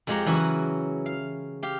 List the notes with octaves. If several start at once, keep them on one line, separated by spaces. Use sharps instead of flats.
F2 F3 G#3 G4 F#5 A#5
C#3 E3 F#3 C#4 F#4 A#4
F5
G4 F5